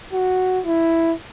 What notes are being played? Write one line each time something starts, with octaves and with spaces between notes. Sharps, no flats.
F#4
E4